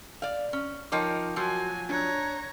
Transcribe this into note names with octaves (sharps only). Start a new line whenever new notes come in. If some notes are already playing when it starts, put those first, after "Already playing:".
D5 F5
C#4
F3 D#4 A#4 C#5 G5 D6
F3 F#3 F#4 G#5
D4 C#5 A#5 F#6